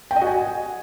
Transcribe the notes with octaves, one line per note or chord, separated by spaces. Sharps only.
G5
D#5
F#4
G#5